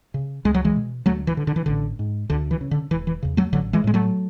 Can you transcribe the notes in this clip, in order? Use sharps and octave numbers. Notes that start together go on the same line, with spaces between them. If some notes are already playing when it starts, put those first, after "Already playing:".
C#3
C#2 G#3
F#3
E3 G#3
B2
D2 F#3 A3
E3
D3
D3
E3
A1 D3
G#2
D2 D3
E3
C#3
D3
E1 E3
E3
E2 C#3
F#3 A3
A1 D3 F#3
E3 G#3
A2 G#3
F#3 A3